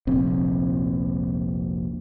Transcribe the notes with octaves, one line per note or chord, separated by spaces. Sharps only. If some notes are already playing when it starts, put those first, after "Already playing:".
F1 A#1 C4